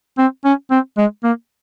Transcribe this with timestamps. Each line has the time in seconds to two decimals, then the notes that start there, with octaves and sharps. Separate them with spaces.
0.18 C4
0.45 C#4
0.71 C4
0.98 G#3
1.24 A#3